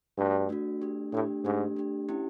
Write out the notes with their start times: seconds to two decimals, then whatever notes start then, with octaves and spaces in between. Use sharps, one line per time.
0.17 G2 A3 D4 F#4
0.49 A3 D4 F#4
0.82 A3 D4 G4
1.12 A2 A3 D4 G4
1.44 G#2 A3 D4 G4
1.76 A3 D4 G4
2.09 C#4 E4 G4